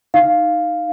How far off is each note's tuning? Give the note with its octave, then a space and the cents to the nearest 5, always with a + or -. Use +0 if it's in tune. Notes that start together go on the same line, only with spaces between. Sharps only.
D#4 +0 F5 +0